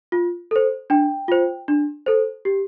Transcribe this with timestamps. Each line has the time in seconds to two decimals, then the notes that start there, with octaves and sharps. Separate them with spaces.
0.12 F4
0.51 A4 C5
0.90 D4 G5
1.28 F4 C5
1.68 D4
2.06 A4 C5
2.45 G4